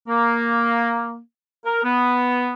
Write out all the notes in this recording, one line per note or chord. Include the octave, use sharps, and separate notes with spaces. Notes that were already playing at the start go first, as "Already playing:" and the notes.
A#3
A#4
B3